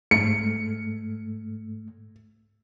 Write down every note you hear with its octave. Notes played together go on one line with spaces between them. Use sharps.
G#2 A3 C#7